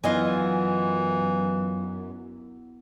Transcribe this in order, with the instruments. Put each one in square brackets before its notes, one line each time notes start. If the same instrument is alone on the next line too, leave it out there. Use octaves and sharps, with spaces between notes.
[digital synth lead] F#2 [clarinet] E3 [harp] B3 E4 [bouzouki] F4 D#5 G#5